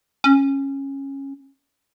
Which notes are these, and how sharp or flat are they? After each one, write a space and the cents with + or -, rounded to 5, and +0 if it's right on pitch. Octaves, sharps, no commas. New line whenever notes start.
C#4 -15